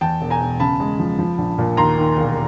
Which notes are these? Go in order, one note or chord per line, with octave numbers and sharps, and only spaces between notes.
E2 G5 A5
E1
G#5 A#5
E1
C#3 A5 B5
G#3
F3
F3
A#1
A#2
D#2 A#5 C6
D#3
E1